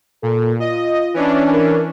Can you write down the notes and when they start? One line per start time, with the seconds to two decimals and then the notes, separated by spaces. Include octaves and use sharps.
0.23 A#2 A4
0.60 F4 D#5
1.14 E3 C#4 D4
1.52 A#4